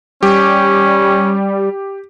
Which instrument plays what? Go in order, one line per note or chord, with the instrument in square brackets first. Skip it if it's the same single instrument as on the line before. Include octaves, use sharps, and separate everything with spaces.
[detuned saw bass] G3 [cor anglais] C#4 [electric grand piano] G4